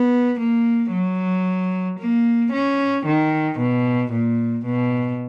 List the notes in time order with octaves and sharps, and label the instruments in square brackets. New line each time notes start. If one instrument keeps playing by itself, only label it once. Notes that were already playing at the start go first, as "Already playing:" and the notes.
Already playing: [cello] B3
A#3
F#3
A#3
C#4
D#3
B2
A#2
B2